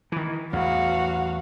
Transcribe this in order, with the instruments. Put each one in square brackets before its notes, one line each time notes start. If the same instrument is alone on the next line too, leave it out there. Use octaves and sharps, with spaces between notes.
[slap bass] D#3 E3
[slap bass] A1 E2 [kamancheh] F#4 F5